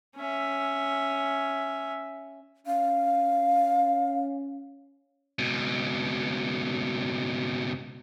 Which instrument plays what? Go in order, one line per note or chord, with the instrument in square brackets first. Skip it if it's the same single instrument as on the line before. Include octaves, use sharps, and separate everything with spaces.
[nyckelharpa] C#4 E5
[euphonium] C#4 [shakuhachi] F5
[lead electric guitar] C#2 B2